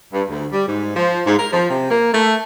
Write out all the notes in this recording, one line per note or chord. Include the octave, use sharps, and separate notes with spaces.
G2
D2
G3
G#2
F3
G#2
A#4
F3
C3
A#3
A3